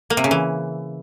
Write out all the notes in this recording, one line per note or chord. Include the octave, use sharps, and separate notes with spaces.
A#3
C3
C#3
E3